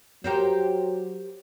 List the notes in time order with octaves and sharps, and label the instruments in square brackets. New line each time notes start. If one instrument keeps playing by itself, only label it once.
[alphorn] F#3 [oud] G4 A#4 C5